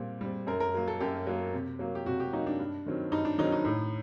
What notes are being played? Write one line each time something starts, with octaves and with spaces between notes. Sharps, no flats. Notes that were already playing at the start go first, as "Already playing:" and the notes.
Already playing: A#2 G3 C4
G3 C4
F#2 A#4
A#4
F#3 A#3
A4
F#2 G4
F#3 A#3
C3
F#3 A#3
G4
C3 F#4
G4
F#3 A#3 D#4
D4
G2
D#3 F#3 C4
G2 D#4
D4
D#3 F#3 C4 D#4
D#4
A2